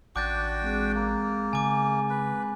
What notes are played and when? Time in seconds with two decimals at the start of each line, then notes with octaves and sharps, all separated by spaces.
0.16 A1 D4 F#4 G5 D6 G6 A6
0.61 G#3 C4 G#4
0.95 A#3
1.53 C#3 G#5 D6
2.10 B4